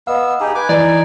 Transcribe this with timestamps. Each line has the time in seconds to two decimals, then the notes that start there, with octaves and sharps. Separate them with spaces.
0.07 B3 D#5 F5 E6
0.40 D#4 G4 G#4
0.55 B4 G#5 D6
0.69 E3 D#4 D5 G#5